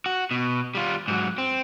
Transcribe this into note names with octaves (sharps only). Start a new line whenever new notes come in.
F#4
B2
G3 F4
G#2 F#3
C4